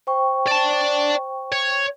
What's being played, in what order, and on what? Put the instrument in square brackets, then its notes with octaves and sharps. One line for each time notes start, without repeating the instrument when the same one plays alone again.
[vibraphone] C5 G5 C#6
[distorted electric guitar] D5 A5
C#5